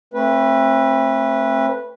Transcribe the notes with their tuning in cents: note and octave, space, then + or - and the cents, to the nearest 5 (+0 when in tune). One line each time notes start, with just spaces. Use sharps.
A3 +15 C4 +30 B4 -10